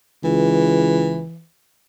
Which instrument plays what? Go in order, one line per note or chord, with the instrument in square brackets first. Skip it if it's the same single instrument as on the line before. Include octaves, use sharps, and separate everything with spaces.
[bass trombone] C#2 [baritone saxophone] E3